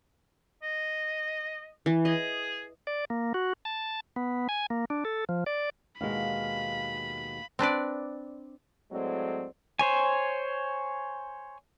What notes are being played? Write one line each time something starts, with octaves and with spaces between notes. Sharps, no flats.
D#5
E3
G#4 D#5
D5
A#3
F#4
A5
B3
G#5
A#3
D4
A4
F3
D5
D#2 B2 G#3 F5 B5
C4 D4 B4 D5
A2 F#3 G#3 A3 C4 D5
C5 C#5 G#5